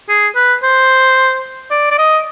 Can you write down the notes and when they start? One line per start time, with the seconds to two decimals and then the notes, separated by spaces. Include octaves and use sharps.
0.09 G#4
0.35 B4
0.63 C5
1.71 D5
1.91 D5
1.98 D#5